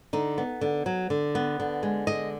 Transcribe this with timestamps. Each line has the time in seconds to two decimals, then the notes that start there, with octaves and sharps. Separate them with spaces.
0.13 D3 D#4
0.38 B3
0.61 D3
0.86 F#3
1.10 D3
1.35 B3
1.60 D3
1.83 G#3
2.07 D3 D#5